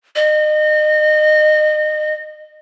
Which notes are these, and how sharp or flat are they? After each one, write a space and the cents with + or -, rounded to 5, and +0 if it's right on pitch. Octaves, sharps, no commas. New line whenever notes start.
D#5 -30